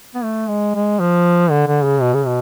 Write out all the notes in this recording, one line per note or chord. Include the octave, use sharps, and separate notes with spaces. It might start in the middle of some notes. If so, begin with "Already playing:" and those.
B3
A3
G#3
G#3
F3
D3
D3
C#3
B2
C#3
B2